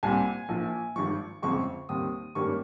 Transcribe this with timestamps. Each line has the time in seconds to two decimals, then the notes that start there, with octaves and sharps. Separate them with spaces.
0.03 C2 A#2 G3 C4 G#5
0.49 A#1 A#2 F3
0.96 G#1 G2 F3 C#6
1.42 G1 F2 C#3 G#3 C4 C#6
1.89 D#2 D#3 G3 C4 D#6
2.35 G#1 G2 G3 A#3 C#4 C#6